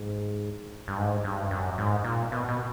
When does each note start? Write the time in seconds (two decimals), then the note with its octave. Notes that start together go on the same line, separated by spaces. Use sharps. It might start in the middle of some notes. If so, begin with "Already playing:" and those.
Already playing: G#2
0.88 G2
0.98 G#2
1.24 G2
1.51 F#2
1.78 G#2
2.05 A#2
2.32 B2
2.48 B2